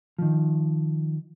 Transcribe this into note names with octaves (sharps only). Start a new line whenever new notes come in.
D#3 F3